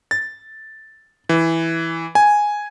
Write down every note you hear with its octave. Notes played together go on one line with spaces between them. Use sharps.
A6
E3
G#5